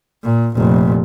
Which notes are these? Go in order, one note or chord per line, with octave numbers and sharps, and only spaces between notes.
A#2
F1 A#2